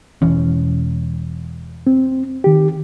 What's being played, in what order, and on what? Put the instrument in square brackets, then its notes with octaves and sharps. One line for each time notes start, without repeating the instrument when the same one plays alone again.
[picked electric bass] E1 E3 C#4
[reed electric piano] C4
D#3 G4